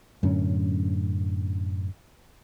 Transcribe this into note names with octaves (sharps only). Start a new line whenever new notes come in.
F#2 A2 D3 C#4